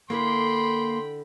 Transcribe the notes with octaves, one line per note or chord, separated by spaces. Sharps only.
D3 A#3 E4 A#4 G5 B5 C6